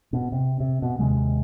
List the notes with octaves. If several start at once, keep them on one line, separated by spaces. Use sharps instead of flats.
B2
C3
C3
B2
D#2 C3 D#3 G#3